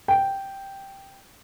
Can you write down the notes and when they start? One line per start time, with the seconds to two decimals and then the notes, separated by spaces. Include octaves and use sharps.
0.08 G5